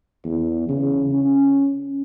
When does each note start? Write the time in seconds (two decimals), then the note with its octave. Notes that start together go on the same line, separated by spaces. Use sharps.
0.24 E2
0.68 C#3
1.12 C#4